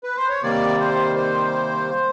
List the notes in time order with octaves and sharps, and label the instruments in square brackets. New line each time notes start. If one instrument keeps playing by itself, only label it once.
[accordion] B4
C5
C#5
C3 D#3 G3 A#3 D5
C5
C5